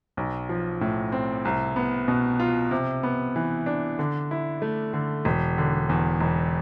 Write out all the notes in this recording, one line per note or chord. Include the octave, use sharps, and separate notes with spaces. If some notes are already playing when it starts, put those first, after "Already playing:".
B1
F3
A2
C4
C2
B3
B2
F4
C3
B3
E3
D4
D3
E4
A3
D3
E1
D3
E2
E1